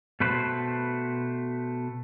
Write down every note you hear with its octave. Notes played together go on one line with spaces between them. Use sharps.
B2 A3 B4 C5